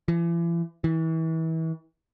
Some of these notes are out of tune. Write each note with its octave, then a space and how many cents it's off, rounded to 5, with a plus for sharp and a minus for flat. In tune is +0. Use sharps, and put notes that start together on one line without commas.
E3 +40
E3 -30